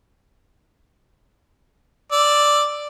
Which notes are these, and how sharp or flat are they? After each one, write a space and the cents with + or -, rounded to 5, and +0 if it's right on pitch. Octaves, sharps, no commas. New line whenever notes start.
D5 +0 E6 +0